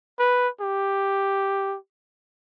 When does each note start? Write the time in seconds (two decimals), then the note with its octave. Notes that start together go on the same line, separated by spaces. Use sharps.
0.20 B4
0.61 G4